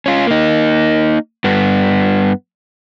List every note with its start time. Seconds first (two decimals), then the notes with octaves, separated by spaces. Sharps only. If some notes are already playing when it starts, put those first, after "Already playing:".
0.06 C#4 F4
0.27 A#3 D#4
1.44 G2 B3